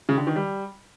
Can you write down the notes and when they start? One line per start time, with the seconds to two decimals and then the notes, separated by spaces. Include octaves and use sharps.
0.09 C#3
0.18 D3
0.27 D#3
0.36 G3